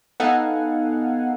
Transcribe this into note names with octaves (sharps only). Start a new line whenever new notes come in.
B3 D#4 A4 F5 F#5 G#5